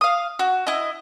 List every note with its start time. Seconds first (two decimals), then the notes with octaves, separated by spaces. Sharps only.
0.01 F5 D#6
0.39 F#4
0.67 E4 D#5